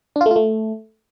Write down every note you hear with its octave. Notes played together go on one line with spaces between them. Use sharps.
D4
F4
A3
F4
A3